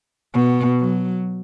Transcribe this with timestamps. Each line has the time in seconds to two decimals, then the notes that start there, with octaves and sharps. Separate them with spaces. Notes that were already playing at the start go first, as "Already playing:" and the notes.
0.34 B2
0.80 F#3